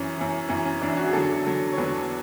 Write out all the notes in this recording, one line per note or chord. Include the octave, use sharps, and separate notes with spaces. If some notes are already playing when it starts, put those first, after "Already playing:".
Already playing: F#2 E3 C#4
F#2 E3
F#2 E3 C#4
C#4
F#2 E3 D4
E4
F#4
G#4
E2 D3 F#3 A4
E2 D3 F#3
C#5
E2 D3 F#3 B4